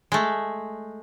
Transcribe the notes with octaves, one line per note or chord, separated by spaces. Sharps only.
G#3 A3